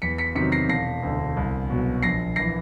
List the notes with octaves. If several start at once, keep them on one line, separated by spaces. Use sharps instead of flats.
E2 B6 C#7
B6 C#7
C3 D#3 F#3 B6 C#7
A#6 C7
E1 A#6 C7
D2 D3
C2
B2 F#3
A#1 A#6 C7
E3 A#6 C7